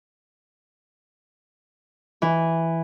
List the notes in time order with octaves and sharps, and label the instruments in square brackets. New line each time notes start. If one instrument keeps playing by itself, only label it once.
[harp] E3